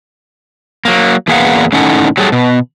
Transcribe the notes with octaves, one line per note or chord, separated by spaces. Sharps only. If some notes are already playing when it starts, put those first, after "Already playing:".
F#3 A#3
E2 A#3 G#4 B4 F5 F#5
A2 D#3 C#4 D#4 A4 F#5
F#3 G3 G#4 A4
B2